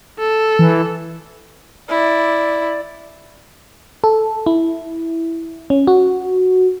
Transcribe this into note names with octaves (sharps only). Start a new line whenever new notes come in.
A4
E3
E4 D5
A4
E4
C#4
F#4